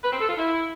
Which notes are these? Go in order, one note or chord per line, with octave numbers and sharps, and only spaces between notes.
B4
C4
A4
F4
E4